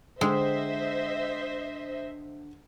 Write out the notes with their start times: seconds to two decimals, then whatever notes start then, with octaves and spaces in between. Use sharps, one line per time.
0.21 D3 G#3 C5 D#5 E5 G5 E6